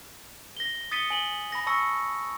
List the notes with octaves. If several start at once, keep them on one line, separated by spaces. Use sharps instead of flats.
A#6 G7
D#6 A6 B6 C#7 D#7 G7
G#5 F#7 G7
B5 A#6
A5 C#6 E6 A#6 C#7